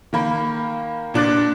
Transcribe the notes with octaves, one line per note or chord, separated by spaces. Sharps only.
D#3 A#3 B5
A#2 D4 D6 F#6 A6